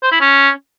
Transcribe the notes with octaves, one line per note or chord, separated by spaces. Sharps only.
C5
E4
C#4